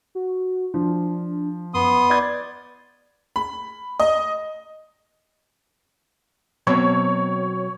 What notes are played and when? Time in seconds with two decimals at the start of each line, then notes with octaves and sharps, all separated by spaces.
0.15 F#4
0.74 F3 D4
1.74 F#2 B3 C6 D#6
2.10 D5 G#6 A6
3.36 B5
4.00 D#5
6.67 B2 F#3 C4 C#5